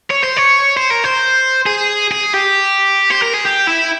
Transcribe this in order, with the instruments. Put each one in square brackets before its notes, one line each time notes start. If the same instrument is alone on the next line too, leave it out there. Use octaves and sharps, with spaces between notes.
[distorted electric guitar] C#5
C5
C#5
C5
A#4
C5
G#4
G#4
G4
C5
A#4
G#4
G4
E4